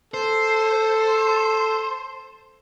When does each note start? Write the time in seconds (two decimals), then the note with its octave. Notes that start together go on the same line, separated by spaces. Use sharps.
0.14 A4 C5